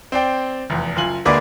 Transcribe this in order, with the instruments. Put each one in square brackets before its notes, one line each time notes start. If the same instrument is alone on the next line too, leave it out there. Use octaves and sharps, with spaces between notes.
[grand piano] C4 D5 G5
F1 E2
F#1 F4 G#5 F#7
D2 G#3 A#3 B4 D5 D6